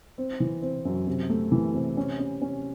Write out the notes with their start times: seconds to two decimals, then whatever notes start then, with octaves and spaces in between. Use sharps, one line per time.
0.18 C4
0.40 E3
0.62 C4
0.85 F#2
1.07 C3
1.30 A3
1.52 E3
1.74 C3
1.97 C#4
2.19 C#4
2.42 C#4